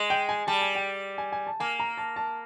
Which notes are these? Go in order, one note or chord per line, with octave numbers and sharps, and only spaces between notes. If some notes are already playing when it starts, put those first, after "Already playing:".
Already playing: G#3
G5
G#5
G3 A5
G#5
G5
G#5
G#5
A5
A#3 G#5
A#5
A5
A5